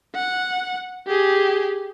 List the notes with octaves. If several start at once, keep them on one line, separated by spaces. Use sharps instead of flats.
F#5
G4 G#4